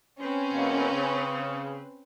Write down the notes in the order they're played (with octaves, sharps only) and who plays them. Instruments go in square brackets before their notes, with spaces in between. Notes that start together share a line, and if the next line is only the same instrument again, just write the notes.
[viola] C4 B4 [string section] C#4
[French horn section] E2 B2 A#3
C#3